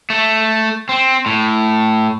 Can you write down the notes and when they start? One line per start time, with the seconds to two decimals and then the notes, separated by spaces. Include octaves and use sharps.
0.10 A3
0.89 C4
1.26 A2